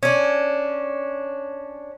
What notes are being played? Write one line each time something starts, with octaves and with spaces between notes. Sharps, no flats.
C#4 D4